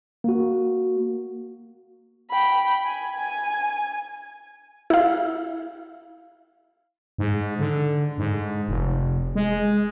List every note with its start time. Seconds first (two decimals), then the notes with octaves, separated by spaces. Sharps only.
0.24 A#3 F#4
2.30 G5 B5
2.86 G#5
3.17 G#5
4.90 E4 F5
7.18 G#2
7.59 D3
8.18 G#2
8.69 F1
9.35 G#3